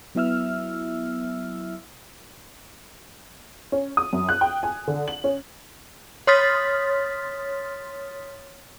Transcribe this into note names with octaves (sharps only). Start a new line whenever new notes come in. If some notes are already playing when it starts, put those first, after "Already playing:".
F#3 B3 E4 E5 E6 F6
C#4
D#6
F#2
F#6
G5
G#5
D3
F#7
C#4
C#5 C6 D#6 F6 A6 B6